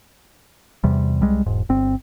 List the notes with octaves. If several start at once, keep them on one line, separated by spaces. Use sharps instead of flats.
E2 C3 G3
C2 G3 G#3
E1 G#2
G1 C4